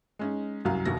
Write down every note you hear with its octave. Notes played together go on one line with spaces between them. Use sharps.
G#3 C#4 D#4
C2 F#2 F#3 F5 A#5
F1 D#2 B2 A#6